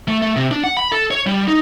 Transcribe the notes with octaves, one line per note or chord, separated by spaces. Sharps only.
A3
A3
C3
D4
F#5
B5
A4
C#5
G3
D#4